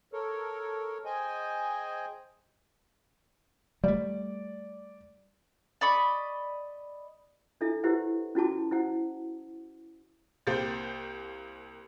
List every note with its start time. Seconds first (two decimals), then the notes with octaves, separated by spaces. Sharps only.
0.13 A4 A#4 C#5
1.05 G#4 C5 D#5 G5 G#5
3.84 G3 A3 D5
5.81 D5 D#5 B5 C#6
7.61 D4 E4 A4 E5
7.83 E4 G4 B4 C5 E5 F#5
8.35 C#4 E4 F#4 A5 D6
8.71 E4 C5 F#5
10.47 C2 A#3 G4 C5 A6